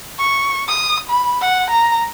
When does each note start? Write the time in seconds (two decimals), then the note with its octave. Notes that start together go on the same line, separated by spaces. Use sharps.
0.19 C#6
0.68 D#6
1.10 B5
1.41 F#5
1.70 A#5